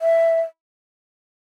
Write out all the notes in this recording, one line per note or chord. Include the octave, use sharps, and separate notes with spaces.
E5